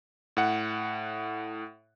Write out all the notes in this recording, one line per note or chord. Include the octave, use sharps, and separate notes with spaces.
A2 F#5